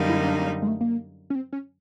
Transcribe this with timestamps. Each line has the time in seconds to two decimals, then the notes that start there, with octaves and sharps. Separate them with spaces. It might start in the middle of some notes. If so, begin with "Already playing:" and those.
Already playing: F#2 D3 G3 A#3 D#4
0.09 E4
0.23 C#4
0.27 D4
0.41 C#4
0.62 G#3
0.68 A3
0.81 A#3
1.30 C#4
1.35 C4
1.53 C#4